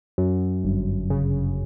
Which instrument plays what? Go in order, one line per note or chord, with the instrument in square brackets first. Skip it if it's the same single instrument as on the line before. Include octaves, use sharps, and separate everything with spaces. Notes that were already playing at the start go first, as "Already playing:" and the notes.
[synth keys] F#2
G1
C#3